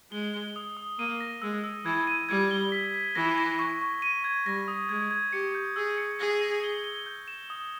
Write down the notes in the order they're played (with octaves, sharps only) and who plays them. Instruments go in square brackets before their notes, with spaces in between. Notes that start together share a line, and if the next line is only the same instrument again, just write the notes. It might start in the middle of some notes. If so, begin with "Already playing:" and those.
[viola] G#3 [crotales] G7
[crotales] G7
D#6
D#6
[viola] A#3 [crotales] D#7
[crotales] A#6
[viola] G#3 [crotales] E6
[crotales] E6
[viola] E3 [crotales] G#6
[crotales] D#7
[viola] G3 [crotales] G#6
[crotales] G7
B6
B6
[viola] E3 [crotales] A#6
[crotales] A#6
C#6
C#6
D#7
G#6
[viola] G3 [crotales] A#6
[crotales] D#6
[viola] G#3 [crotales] G#6
[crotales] G#6
[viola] G4 [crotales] C#7
[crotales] G6
[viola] G#4 [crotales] E6
[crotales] C#7
[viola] G#4 [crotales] A#6
[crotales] A#6
G7
G7
G6
E7
D#6